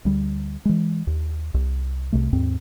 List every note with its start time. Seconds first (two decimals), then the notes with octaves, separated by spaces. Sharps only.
0.05 D2 G3
0.65 E3 G#3
1.07 D#2
1.54 C2
2.13 C2 C3 A3
2.33 D#2 G#2 C4